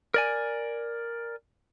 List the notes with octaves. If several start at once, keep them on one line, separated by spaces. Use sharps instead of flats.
A#4 D5 G#5